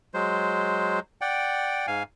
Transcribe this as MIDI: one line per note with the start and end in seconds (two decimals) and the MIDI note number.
0.14 1.00 54
0.14 1.00 56
0.14 1.00 72
1.21 1.86 74
1.21 1.86 78
1.21 1.86 79
1.87 2.03 44
1.87 2.03 77
1.87 2.03 80